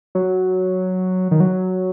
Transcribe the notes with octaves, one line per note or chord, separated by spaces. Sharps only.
F#3
D#3
F#3